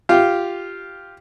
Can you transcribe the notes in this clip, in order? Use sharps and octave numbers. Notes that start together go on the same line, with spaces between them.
F4 G4